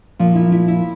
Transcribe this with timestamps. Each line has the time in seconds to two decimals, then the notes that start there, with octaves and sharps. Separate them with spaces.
0.19 A#2 F3 F4
0.35 E4
0.52 E4
0.68 E4